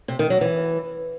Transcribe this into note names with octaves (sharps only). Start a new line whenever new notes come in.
C3
D#3
F#3
E3